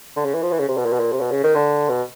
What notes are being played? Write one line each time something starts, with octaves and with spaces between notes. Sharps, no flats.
D3
C#3
E3
F3
E3
C#3
C3
B2
A#2
B2
A#2
C3
B2
C#3
D#3
D3
B2